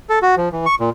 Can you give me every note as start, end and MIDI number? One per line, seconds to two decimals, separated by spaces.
0.09 0.19 69
0.22 0.35 66
0.37 0.49 53
0.52 0.66 52
0.66 0.75 85
0.80 0.90 46